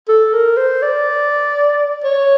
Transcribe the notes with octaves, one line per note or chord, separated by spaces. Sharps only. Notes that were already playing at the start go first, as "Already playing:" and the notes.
A4
A#4
C5
D5
C#5